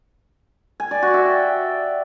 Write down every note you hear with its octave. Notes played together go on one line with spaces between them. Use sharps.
G#5
D5
F#4
E5
G5